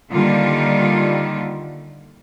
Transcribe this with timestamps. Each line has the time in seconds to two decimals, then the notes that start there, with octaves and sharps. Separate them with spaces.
0.11 D3 D#3 G3 A#3 F4